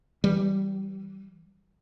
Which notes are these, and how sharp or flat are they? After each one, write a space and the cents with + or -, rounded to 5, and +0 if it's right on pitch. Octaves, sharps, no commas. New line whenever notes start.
E3 +0 G3 -15